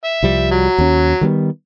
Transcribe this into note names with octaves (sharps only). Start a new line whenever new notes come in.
E5
C2 F3 G3
F#3
D#2 C#4
D#3 G3 B3